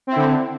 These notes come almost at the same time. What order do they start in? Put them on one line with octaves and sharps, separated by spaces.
C4 E4 D3